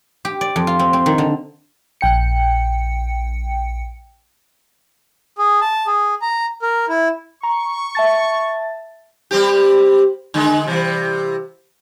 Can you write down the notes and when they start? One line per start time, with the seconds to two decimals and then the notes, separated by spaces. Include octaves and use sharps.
0.25 G4
0.41 D5
0.56 F2
0.67 F4
0.79 C4
0.93 C4
1.06 D#3
1.18 D3
2.01 A#1 G5 C#7
5.38 G#4
5.61 A5
5.87 G#4
6.22 A#5
6.62 A#4
6.89 E4
7.43 A#5 C#6
7.95 E5 A5 A6
9.31 G3 C4 G4
10.34 D3 G#3
10.66 C3 E3 G3